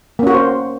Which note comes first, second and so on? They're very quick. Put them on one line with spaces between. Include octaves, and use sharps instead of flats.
A#3 C#4 F#4 A#4 C5